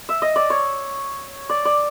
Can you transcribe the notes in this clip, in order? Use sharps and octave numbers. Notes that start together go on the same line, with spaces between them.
E5
D#5
D5
C#5
D5
D5